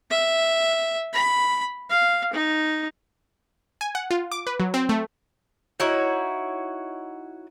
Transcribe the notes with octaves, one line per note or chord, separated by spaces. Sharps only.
E5
B5
F5
D#4
G#5
F#5
F4
D6
B4
F#3
C4
A3
D#4 E4 F#4 C#5